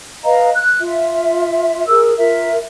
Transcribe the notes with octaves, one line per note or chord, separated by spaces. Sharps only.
B4 D#5 F5 A#5
F#6
F4 E5
G#4 A#4 E6
F4 A#4 E5